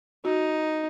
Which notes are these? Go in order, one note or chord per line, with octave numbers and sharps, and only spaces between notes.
D#4 F#4